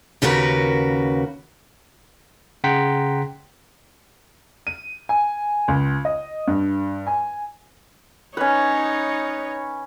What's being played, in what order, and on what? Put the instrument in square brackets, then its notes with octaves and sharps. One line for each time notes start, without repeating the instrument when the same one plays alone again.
[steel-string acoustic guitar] D#2 C#3 F#4 A#4 B4
[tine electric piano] C#3 F#5 G5 A#5 C6 B6
[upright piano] D#7
G#5
C#2
D#5
G2
G#5
[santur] C#4 B4 [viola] D#4 C#5